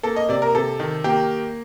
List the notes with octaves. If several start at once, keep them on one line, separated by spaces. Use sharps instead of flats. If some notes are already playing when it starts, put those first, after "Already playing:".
A#3 A4
D#5
C3 D5
A#4
C3 A4
D#3
A#3 G4